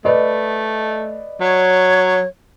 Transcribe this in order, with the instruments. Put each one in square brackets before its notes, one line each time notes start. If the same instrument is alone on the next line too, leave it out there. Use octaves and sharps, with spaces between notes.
[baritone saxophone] A3 [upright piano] B4 D5 D#5
[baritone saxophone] F#3 [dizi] C#5